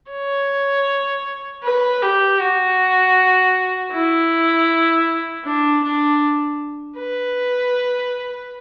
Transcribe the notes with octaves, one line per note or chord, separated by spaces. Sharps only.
C#5
B4
G4
F#4
E4
D4
D4
B4